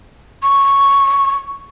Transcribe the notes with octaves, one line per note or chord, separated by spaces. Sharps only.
C#6